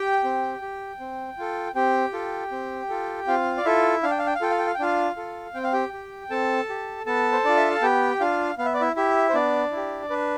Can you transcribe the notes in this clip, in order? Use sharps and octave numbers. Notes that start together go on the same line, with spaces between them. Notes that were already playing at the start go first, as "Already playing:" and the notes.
Already playing: G4 G5
C4
G4
C4
F4 A4
C4 G4 G5
F4 A4
C4
F4 A4
C4 F4 F5
D5
E4 F4 A4 E5
D4 F5
G5
F5
G5
F5
F4 A4 G5
F5
G5
F5
G5
D4 F4 F5
F4 A4
C4 G5
F5
G4 G5
G4
C4 A4 A5
G4
B3 A4 A5
C5
D4 F4 D5
E5
F5
B3 G4 G5
D4 F4 F5
B3 F5
E5
D5
E4 E5
E4 G4 E5
C5
B3 D4 D5
E4
G4
D4 B4